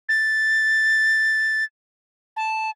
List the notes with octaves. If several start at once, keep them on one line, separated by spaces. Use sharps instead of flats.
A6
A5